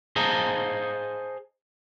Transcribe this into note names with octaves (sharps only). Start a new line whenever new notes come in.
G#4 C5 D#5 F5 A5 A#5